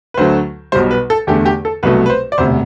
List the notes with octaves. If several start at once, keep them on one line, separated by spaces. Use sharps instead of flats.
B4
D2 D3 F#3 A3 C5
B1 B2 G3 C5
B4
A4
E2 D3 A3 G4
G4
A4
C2 B2 F#3 A3 B4
B4
C5
D5
E1 D2 C3 C5